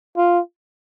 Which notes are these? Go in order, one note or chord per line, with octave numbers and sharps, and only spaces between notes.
F4